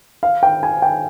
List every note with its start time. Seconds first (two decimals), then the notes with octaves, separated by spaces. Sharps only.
0.23 F5
0.43 G5
0.63 G#5
0.82 G5